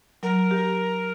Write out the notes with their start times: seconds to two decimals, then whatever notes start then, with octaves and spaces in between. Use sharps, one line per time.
0.23 F#3 A#4
0.51 G4